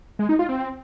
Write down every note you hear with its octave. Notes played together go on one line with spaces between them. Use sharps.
G#3
D#4
F4
C4